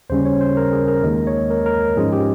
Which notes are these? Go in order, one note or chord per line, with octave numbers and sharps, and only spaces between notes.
D#2 C#3 G3 C#4 C5
C#5
C5
A#4
G#4
A#4
D#2 D#3 G#3 D#5
C#5
A#4
A#4
G#2 F3 G#3 C#4 G#4
G4